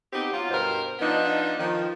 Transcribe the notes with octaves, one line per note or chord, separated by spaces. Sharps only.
B3 C4 D#4 G4
F#3 F4
G2 B2 A#4 C5
F3 B3 D4 D#4
D#3 F3